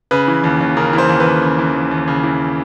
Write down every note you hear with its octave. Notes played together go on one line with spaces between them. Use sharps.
C#3 B4
E3
D#2
D#2
C#3 A#4
E3
C5
D#2
B4
D#2
C#3
E3
D#2
D#2
C#3
E3